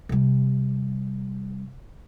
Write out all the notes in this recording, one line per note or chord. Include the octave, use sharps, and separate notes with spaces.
C3 G3